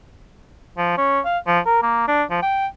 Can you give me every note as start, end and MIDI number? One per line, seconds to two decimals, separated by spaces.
0.77 0.94 53
0.97 1.20 61
1.25 1.38 77
1.47 1.59 53
1.66 1.82 70
1.82 2.03 58
2.08 2.23 62
2.30 2.39 53
2.42 2.67 79